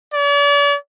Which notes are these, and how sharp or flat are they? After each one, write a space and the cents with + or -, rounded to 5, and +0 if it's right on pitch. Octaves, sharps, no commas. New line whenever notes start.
D5 -45